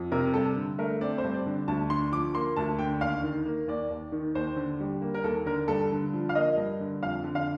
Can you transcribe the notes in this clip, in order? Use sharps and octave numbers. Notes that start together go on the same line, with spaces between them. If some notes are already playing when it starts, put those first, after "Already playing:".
Already playing: F2
C3 A#4
G2 A4
D3
A3 A#4
C4 D5
C5
G2
D5
D3
D2 A5
D3 C6
F3 D6
A#3 C6
D2 A5
D3 G5
D#2 F5
D#3
A#3
D#2 D5
D#2
D#3
D#2 C5
D3
G3
A#3
A#4
D#2 A4
D3 A#4
G2 A4
D3
F3
F5
A#3 D#5
G2
D3
F2 F5
D3
F5